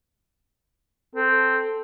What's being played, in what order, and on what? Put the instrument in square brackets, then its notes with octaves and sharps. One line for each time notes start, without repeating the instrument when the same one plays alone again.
[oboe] C4 [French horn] A4